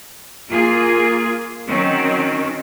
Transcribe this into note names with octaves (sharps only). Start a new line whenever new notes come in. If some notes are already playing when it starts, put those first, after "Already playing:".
A#3 F4 G#4
D#3 F#3 C4 C#4